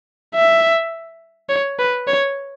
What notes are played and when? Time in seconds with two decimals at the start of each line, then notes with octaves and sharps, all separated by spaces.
0.35 E5
1.50 C#5
1.79 B4
2.08 C#5